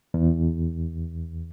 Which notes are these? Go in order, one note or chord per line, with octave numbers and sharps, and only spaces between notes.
E2